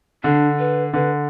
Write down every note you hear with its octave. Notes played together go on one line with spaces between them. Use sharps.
D3 D4
B4
D3 B4